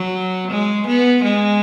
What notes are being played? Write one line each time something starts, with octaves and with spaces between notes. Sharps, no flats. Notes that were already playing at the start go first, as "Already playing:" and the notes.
Already playing: F#3
G#3
B3
G#3